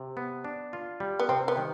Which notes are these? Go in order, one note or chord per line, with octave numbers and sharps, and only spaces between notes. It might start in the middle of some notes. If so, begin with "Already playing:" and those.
Already playing: C3
B3
D4
F4
G3
B3
C3 C4
B3
D#3